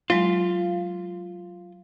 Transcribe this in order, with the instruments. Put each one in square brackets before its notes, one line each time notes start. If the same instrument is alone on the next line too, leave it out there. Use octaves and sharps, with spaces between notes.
[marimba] F#3 G#3 [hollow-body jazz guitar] F4